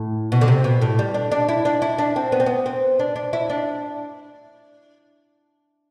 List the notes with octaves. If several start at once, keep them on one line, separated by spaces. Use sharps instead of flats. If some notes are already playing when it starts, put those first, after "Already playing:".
Already playing: A2
B2
D3
C3
B2
A2
G3
D4
D4
E4
D4
E4
D4
C4
B3
C4
B3
C4
D4
D4
E4
D4